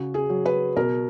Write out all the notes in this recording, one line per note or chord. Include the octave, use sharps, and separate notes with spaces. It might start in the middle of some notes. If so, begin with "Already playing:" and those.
Already playing: C#3 F#4
G#4
F#3
B4
B2 A#4